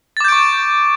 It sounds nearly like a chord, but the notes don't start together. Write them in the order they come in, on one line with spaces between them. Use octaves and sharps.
A6 D6 G6 D7 C#6